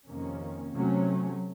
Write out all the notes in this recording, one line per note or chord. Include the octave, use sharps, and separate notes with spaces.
F2 C3 D#3 A#3 C#4
C3 F#3 A3 C#4